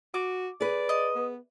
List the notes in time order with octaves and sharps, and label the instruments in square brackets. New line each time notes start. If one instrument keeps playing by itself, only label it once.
[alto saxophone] F#4 [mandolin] D6
[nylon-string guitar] G#4 B4 [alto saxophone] D5
[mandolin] D#5
[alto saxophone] B3